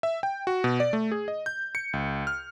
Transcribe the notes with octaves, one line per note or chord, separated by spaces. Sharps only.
E5
G5
F#4
B2
D5
A3
G#4
D#5
G6
C#7
C#2
F6